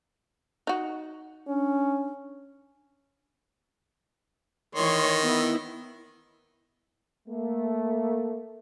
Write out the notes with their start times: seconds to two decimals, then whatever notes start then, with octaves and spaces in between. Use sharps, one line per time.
0.67 D#4 F#4
1.48 C#4 D4
4.75 D#3 E3 C#5 C6
5.24 B3 E4
7.28 A3 A#3